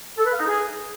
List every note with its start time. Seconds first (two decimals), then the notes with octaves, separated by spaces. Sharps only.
0.17 A4
0.24 B4
0.32 F5
0.39 D#4
0.47 G#4